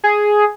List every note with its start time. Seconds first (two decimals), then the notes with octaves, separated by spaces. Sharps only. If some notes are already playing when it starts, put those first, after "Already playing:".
0.04 G#4